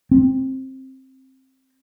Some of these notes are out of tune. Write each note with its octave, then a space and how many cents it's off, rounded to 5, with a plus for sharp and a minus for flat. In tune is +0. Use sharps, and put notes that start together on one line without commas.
C4 +15